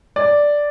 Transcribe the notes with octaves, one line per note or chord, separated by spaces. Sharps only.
D5